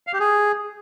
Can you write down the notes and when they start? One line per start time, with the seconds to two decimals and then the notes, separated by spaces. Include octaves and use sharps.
0.07 F5
0.13 G4
0.20 G#4